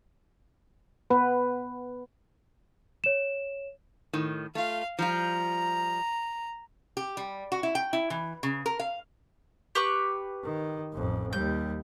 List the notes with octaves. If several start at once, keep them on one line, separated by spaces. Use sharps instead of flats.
B3 B4
C#5 E7
A2 D#3
A3 F4 F5
F3 G3 F4 A#5
G4
G3
F#4
E4
G5
E4
E3
C#3
A#4
F5
G4 B4 C#6
D#3
A1 F2
D#2 G3 G6